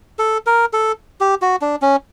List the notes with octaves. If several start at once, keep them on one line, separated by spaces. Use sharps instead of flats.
A4
A#4
A4
G4
F#4
D4
C#4